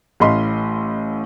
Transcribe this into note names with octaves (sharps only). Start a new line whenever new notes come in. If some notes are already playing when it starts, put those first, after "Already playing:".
A1 A2 D#5 F5 B5 C6